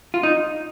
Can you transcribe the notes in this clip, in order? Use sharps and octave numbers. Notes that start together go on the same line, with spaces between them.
F4
D#4